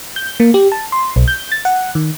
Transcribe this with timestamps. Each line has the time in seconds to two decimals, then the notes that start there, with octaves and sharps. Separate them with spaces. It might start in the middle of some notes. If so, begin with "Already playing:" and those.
0.16 G6
0.40 A#3
0.54 G4
0.72 A5
0.92 C6
1.16 B1
1.28 G6
1.52 A6
1.65 F#5
1.95 D#3